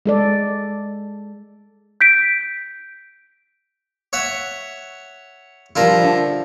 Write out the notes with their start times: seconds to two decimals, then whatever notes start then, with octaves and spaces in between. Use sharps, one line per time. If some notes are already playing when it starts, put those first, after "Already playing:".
0.06 G#3 A4 D5
2.01 G6 B6 D7
4.13 C#5 E5 F#5
5.76 F3 G3 D4 E4 F4 A#4
6.03 D3 A3